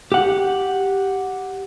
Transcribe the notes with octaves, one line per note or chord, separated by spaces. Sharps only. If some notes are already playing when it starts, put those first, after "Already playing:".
G4 F#5